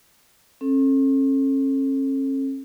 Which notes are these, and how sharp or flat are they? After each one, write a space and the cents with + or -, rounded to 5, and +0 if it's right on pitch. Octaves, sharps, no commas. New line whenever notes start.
C#4 -45 A4 +0